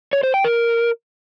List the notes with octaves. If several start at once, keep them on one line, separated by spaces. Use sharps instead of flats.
C#5
C5
G5
A#4